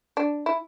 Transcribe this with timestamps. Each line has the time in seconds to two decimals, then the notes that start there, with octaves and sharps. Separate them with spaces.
0.17 D4
0.46 E4